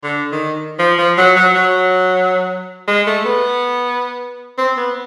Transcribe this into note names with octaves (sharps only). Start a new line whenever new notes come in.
D3
D#3
F3
F3
F#3
F#3
F#3
G#3
A3
B3
C4
B3